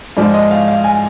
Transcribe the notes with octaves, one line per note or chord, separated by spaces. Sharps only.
G#2 F3 G#3 D5
D#5
F5
F5
G#5